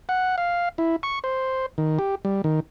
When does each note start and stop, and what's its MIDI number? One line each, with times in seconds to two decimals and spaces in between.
0.09 0.36 78
0.38 0.69 77
0.78 0.96 64
1.03 1.19 85
1.24 1.66 72
1.78 1.99 51
1.99 2.15 67
2.25 2.42 55
2.44 2.60 51